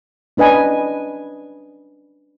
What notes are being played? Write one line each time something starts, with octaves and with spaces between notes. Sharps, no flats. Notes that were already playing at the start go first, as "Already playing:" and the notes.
C#4 D4 B4 D#5 G#5